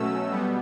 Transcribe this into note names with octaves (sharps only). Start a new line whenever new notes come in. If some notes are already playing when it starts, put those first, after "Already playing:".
Already playing: B2 F#3 A3 C#4 E6
B2 G3 B3